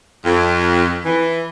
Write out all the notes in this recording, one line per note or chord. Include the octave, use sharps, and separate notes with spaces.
F2
E3